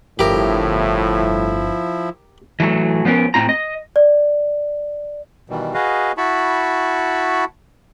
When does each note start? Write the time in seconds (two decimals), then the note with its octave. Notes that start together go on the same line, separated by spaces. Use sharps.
0.19 G1 A2 F3 E4 G4 A#4
2.60 E3 F#3 A3
3.05 F3 B3 C#4 A#4
3.34 A2 C4 F4 A#5
3.49 D#5
3.96 D5
5.50 B2 D#3 E3 G3
5.74 F#4 G#4 B4 D#5 F5
6.18 E4 F#4 A5 B5 C#6